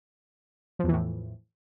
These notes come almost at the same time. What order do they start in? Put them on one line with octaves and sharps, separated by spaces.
F3 E2 E3 A2